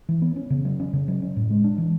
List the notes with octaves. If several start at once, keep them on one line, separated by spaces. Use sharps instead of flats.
E3
B3
C#4
C#3
F#3
C#4
C#3
F#3
C#4
A2
G#3
D4
E3